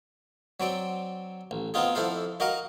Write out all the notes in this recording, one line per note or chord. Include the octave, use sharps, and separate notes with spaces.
F#3 C4 D5
A1
B3 C4 D#4 F4 G#4
F2 E4 A4 C5 F5
D#4 F#4 A#4 D#5 F5